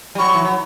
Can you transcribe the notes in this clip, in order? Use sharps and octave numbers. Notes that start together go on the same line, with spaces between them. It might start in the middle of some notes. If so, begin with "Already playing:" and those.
G3
F#3 C#6
E3
F#3